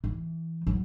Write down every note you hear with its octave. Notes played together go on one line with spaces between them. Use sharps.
E3
F#3